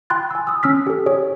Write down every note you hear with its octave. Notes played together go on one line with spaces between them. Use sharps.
G5 B5 C6 F#6 A6
G#5 E6
D#6 E6
C#4 E6 F6 B6
G4 A4
G4 G#4 C#5 D5